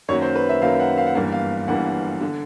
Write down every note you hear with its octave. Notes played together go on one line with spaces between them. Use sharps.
F#2 D#3 F#3 A#3 C#5
C5
B4
E5
F#2 D#3 F#3 A#3 F5
F#5
F5
F#5
G1 G2 E3 G3 A#3 F5
F5
G1 G2 E3 G3 A#3 F#5
D3